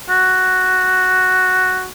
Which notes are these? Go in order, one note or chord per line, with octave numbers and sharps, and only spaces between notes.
F#4